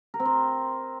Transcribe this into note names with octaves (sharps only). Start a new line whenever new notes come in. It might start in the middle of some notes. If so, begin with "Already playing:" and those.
A#4
C4
C5